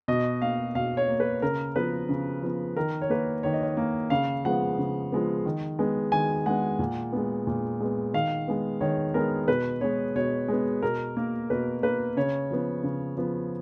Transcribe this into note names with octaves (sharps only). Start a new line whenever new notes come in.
B2 D#5
A#3 F5
B2 F5
C#5
A#3
B4
C#3 A#4
F3 B3 B4
C#3
F3 B3
D#3 A#4
C#5
A#3 B4
D#3 C#5
D#5
C#5
A#3
C#3 F5
F3 G#3 B3 F#5
C#3
F3 G#3 B3
D#3
G#3 B3
D#3 G#5
G#3 B3 F#5
A#2
G#3 B3
A#2
G#3 B3
D#3 F5
G#3 B3
D#3 C#5
G#3 B3 A#4
B2 B4
G#3 B3 C#5
B2 C#5
G#3 B3
B2 A#4
A#3
B2 B4
A#3 B4
C#3 C#5
F3 B3
C#3
F3 B3